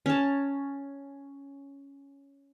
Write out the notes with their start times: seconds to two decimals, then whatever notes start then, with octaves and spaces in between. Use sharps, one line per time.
0.06 C#4 A5